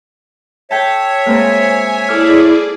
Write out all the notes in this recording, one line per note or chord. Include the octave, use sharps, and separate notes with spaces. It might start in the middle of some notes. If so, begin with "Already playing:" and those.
A4 C#5 E5 G5 A5
G#3 A#3 C4 G#5
E4 G#4 A4 D5 D6 F6